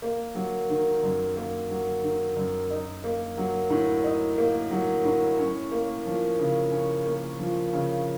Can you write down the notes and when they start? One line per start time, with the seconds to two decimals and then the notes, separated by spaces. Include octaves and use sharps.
0.02 A#3
0.35 F#3
0.69 D#3
1.03 F#2
1.36 A#3
1.69 F#3
2.03 D#3
2.37 F#2
2.70 D#4
3.04 A#3
3.37 F#3
3.70 A2
4.04 D#4
4.38 A#3
4.71 F#3
5.05 A2
5.38 C#4
5.72 A#3
6.06 F3
6.39 C#3
6.72 C#4
7.05 A#3
7.39 F3
7.73 C#3